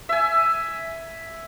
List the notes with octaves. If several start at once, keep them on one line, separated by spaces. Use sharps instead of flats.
E5 G#5